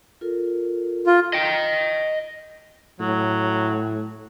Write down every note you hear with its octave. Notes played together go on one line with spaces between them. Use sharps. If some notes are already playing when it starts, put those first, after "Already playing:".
F4 A4 A#4
F4
D#5 G5
A2 F#3